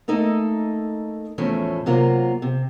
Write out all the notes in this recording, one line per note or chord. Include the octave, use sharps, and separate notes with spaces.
A3 A#3 D#4 A4 D#5
E2 A2 F3 A3 C#4
C3 F#3 A#3 F4
C3